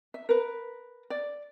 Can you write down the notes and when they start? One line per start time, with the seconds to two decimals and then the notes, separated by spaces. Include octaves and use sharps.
0.14 E5
0.29 A#4 B4
1.10 D5